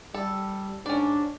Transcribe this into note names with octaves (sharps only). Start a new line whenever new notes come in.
G3 A4
G#2 C#4 D4 D5